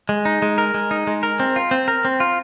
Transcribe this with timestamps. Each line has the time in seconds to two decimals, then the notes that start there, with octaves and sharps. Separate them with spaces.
0.09 G#3
0.25 D#4
0.42 G#3
0.58 A#4
0.74 G#3
0.91 D#4
1.07 G#3
1.23 A#4
1.40 C4
1.56 F4
1.71 C4
1.88 A#4
2.05 C4
2.20 F4